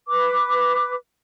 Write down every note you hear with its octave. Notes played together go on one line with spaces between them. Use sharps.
B4 D6